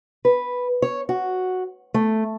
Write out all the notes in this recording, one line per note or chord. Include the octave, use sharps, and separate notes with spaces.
B4
C#5
F#4
A3